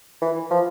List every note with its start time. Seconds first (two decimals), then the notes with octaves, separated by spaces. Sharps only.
0.22 E3
0.51 F3